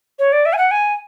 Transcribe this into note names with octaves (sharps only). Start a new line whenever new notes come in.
C#5
D5
E5
G#5
F#5
G#5